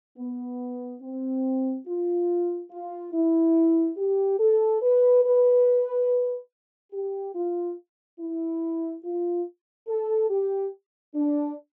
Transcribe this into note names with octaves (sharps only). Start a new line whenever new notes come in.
B3
C4
F4
F4
E4
G4
A4
B4
B4
G4
F4
E4
F4
A4
G4
D4